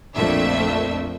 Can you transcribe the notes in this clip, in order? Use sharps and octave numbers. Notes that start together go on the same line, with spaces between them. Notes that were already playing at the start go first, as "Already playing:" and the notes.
A#1 F2 A3 A#3 D4 E5